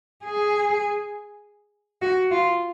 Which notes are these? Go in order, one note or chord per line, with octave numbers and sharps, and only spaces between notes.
G#4
F#4
F4